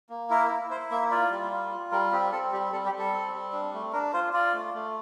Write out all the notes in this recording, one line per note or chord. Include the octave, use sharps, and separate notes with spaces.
A#3
E4 A#4
E4
E4 C5
A#3 E5
F4 D5
G3
F4
F4
G3 A#4
C4 G4
C4 A4
G3 G4
G3 A4
G4
G3
A4
C4
G3
D4
A3
D4 A#4
F4 C5
F4 D5
A3
A3